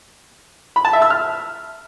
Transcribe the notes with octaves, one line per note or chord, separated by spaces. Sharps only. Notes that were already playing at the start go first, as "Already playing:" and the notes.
B5
A5
E5
E6
F6